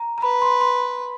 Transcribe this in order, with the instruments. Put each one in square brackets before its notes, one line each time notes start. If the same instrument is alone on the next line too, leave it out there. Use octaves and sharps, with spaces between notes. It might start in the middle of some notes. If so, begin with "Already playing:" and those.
Already playing: [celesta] A#5
A#5
[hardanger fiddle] B4 [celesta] B5
[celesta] C6
C6